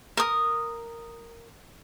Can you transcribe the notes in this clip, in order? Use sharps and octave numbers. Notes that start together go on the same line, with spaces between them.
A#4 D#6